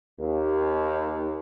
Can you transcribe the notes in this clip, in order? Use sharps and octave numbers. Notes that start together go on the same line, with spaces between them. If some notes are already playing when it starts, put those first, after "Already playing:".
D#2